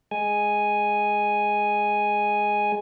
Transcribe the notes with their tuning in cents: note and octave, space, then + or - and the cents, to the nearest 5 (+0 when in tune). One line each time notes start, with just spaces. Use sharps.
G#3 +0 G#5 +0